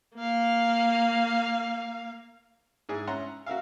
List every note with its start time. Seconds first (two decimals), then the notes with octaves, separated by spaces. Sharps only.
0.15 A#3 F5
2.89 G#2 E4 G#4
3.07 C#4 E5 F#5 A#5 C6
3.46 F#4 A#4 E5 F5